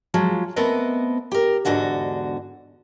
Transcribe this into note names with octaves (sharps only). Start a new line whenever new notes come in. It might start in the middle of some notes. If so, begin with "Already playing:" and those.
F3 F#3 G#3
A3 B3 C4 A#4 B4 D#5
G4 A#4
E2 G#2 D3 F#4 D#5